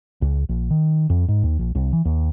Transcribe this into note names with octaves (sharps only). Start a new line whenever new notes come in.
C#2
A#1
D#3
F2
G#2
D#2
A#1
C2
E3
D#2